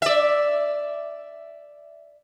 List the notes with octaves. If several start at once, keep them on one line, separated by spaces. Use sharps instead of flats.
D5 E5